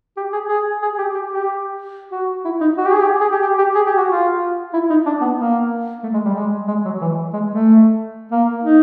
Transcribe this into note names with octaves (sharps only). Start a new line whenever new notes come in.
G4
G#4
G#4
G#4
G4
G4
G4
F#4
E4
D#4
F#4
G4
G#4
G4
G#4
G4
G4
G4
G#4
G4
F#4
F4
E4
D#4
D4
B3
A#3
A3
G#3
G3
G#3
G#3
F#3
E3
G#3
A3
A#3
D#4